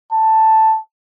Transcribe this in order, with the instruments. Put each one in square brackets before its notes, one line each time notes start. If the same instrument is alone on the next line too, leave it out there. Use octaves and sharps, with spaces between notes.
[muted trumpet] A5